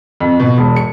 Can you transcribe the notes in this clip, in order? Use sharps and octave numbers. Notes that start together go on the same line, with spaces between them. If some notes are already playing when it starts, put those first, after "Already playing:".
F2
B2
E1
C#7